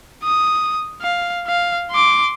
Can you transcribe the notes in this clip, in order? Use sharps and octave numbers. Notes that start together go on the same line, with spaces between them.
D#6
F5
F5
C6 D6